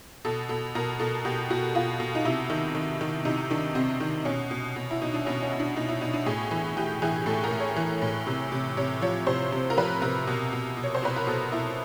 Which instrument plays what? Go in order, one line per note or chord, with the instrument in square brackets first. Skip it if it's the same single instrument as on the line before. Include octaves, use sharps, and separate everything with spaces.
[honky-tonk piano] B2 A4
B2 A4
B2 A#4
B2 A4
B2 G4
B2 F#4
B2 F4
B2
D#4
C3 E4
D#3
D#3
D#3
C3 D#4
D#3 D4
C3 C4
D#3
B2 C#4
B2
B2
E4
B2 D#4
D4
B2 C#4
C#4
B2
D4
B2 D#4
E4
B2 D#4
D4
A2 G#4
E3
E3 G4
E3 G#4
A2 A4
A#4
A2
C#5
E3
A2
C3
C3
C3 C#5
F3 C#5
C3 C5
C3
A#4
F3 B4
C3 A#4
B2
B2
B2
C#5
C5
B2 B4
A#4
B2 A4
B2 E4